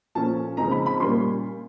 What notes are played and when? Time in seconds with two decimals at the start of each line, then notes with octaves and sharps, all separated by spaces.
0.15 A#2 F3 A3 C#4 F4 A5
0.57 C#3 F3 G#3 C4 D#4 A#5
0.71 B5
0.86 B5
1.00 A#2 G3 A#3 C#4 F4 C6